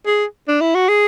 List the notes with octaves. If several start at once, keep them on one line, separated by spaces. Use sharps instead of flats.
G#4
D4
E4
F#4
G#4